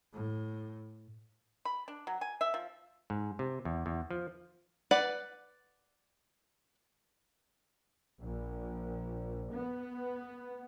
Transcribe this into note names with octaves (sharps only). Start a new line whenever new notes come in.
A2
B5
D4
F#3
G#5
E5
F3
G#2
C3
E2
E2
F3
B4 D5 F#5
A#1
B3